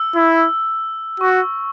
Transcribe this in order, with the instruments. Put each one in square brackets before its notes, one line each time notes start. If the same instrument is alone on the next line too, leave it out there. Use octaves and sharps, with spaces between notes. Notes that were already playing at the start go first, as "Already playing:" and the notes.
Already playing: [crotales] E6
[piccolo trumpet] E4
[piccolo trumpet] F#4 [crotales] C#6